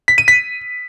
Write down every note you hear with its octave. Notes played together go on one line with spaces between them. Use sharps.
B6
D#7
B6